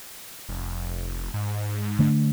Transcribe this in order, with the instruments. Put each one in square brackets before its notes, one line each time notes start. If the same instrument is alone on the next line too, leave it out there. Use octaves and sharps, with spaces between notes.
[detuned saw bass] F1
G#2
[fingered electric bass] D3 A3 D4